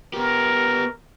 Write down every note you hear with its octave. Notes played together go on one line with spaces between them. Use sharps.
B3 G4 A#4